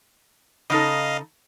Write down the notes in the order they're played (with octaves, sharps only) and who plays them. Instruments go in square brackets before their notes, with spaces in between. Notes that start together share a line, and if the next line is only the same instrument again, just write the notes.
[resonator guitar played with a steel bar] C#3 D#4 A4 [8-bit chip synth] D#5 F5